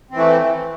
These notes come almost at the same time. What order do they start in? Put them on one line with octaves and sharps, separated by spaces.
C4 E3 A3